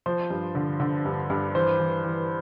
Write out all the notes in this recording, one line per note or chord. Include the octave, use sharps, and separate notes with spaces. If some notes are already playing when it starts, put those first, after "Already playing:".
F3 C5
G2
D3
D3
G2
G2
E3 C5
E3
E3